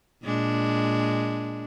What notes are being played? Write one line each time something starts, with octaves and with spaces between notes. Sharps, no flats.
A#2 G#3 D4